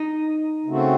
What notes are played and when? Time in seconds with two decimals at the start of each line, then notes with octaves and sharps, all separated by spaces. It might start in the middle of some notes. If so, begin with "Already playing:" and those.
Already playing: D#4
0.66 C#3 A3 C4 F#4